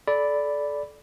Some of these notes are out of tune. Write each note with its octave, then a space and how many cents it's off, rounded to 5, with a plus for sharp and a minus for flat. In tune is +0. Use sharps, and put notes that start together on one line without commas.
A4 -25 D5 -5 B5 +0